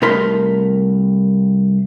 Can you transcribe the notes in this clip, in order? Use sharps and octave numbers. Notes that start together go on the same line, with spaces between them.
C2 A3 A#4 B5 C6